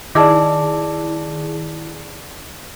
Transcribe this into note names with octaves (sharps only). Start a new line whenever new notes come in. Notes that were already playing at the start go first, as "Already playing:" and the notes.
D#3 E4 G#4 D5 A5 D6